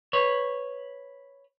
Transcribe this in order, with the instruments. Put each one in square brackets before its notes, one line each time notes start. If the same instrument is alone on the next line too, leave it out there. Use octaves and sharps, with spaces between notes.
[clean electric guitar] B4 C#5